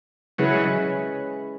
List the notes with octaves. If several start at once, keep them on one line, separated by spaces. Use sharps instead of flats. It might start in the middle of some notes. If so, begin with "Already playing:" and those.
C#3 F#3 G#3 C#4 E4 G#4 B4